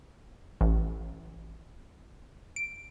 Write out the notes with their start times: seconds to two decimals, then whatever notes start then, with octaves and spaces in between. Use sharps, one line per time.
0.61 A1
2.56 D7